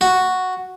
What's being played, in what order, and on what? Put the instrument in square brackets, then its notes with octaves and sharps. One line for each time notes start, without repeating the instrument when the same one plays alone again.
[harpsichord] F#4